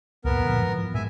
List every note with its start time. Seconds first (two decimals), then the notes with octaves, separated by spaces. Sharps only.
0.25 C#2 F#2 A#2 B3 A#4
0.43 A#2 D3 F3
0.61 G#2 E3 F3
0.94 A2 G#3 E5 G#5